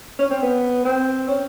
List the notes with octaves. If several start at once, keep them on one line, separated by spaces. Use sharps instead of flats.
C#4
C4
B3
C4
C#4